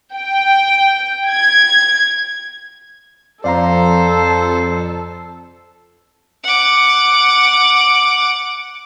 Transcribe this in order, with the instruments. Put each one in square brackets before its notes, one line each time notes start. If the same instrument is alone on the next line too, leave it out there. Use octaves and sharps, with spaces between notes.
[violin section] G5
G#6
[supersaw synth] F2 [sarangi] A4 [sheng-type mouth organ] C5 [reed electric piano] D5 F5 A#5
[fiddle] F#5 D6